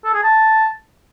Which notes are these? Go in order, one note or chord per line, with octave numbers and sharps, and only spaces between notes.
A4
G#4
A5